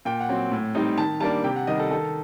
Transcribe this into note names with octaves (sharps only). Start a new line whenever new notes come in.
A#2 G5
F#5
F#3 C4
A2
G3 C4 D#4
D#3 A5
G3 A#3 D4 A5
C3 G5
F#5
D#3 G3 D#5
A4
D#3 A4